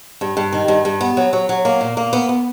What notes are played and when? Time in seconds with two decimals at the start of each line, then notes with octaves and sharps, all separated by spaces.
0.21 G2
0.37 G2
0.52 D#3
0.68 G2
0.85 G2
1.01 B3
1.17 F#3
1.33 F#3
1.49 F#3
1.65 A#3
1.81 A#2
1.97 A#3
2.13 B3
2.29 B3